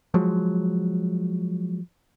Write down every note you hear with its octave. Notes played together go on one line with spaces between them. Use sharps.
F3 F#3 G#3